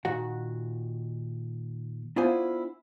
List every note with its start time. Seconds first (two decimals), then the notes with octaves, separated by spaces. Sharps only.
0.05 A#2 D#3 F#4 F#5
2.16 B3 D4 E4 F4 C5 G#5